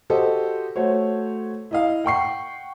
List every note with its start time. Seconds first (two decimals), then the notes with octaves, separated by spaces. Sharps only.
0.10 F#4 G4 A4 C5 D#5
0.76 A3 F#4 C5 C#5
1.71 E4 D#5 F5
2.04 F#5 G5 C#6 C7